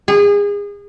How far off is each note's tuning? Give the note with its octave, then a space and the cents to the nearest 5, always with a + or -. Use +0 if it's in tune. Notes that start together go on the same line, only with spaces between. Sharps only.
G#4 -30